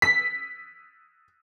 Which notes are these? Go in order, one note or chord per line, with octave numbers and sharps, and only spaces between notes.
B6